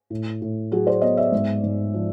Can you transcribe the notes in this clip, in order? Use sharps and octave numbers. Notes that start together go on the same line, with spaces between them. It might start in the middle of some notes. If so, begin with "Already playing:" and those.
A2
A2
F#3 F#4 G#4
C5 D5
B3 C#5 D#5
D5 E5
G#2
G#2
F3